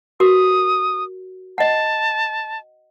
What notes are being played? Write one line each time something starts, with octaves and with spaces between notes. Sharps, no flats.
F#4 A#4 D#6
D#5 F#5 A5